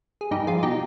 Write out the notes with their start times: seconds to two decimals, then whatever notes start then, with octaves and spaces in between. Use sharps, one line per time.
0.21 G#4
0.31 G2 D#4 G4
0.47 F3 F4 G#4
0.63 B2 D#4 G4